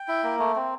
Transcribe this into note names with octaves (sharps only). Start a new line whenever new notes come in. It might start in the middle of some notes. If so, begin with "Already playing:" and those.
Already playing: G5
E4
A#3
A3
C4